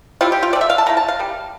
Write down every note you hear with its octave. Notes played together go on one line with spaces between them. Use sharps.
G3 C4 E4 F4
G4
F4
D3 A3 C4 D5
E5
F5
A5
D3 A3 E4 A#5
A5
F5
G3 A#3